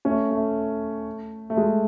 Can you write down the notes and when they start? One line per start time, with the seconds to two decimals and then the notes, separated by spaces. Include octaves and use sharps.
0.05 A3 C#4
0.31 A3
1.50 A3
1.57 G#3